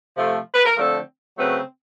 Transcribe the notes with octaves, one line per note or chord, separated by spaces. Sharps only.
C3 F3 A3
B4
A#4
D3 F3 A3 C4 A4
C#3 F#3 A3 C4 B4